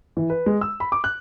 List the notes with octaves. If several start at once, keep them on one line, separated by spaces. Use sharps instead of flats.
E3
B4
G#3
E6
B5
D6
F#6